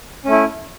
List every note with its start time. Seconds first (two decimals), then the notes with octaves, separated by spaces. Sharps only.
0.25 C#4
0.28 A3
0.31 E4